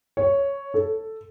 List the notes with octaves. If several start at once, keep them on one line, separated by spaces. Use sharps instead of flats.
C#5
A4